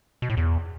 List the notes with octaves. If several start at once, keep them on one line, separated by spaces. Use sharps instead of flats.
B2
A2
E2